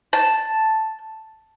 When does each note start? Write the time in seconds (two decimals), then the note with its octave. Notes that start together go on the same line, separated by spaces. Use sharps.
0.13 A5